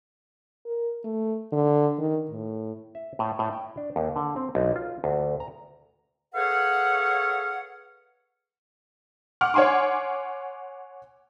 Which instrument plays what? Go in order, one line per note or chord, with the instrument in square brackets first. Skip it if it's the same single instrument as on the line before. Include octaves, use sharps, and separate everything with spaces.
[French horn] A#4
A3
D3
D#3
A2
[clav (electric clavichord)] E5
A2
A2
G5
D4
D#2
D3
C4
B1
F4
D2
A#5
[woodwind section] G#4 A4 B4 C#5 F5 F#5
[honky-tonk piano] F#5 D6 F6
C#5 F#5 G#5 C6 D6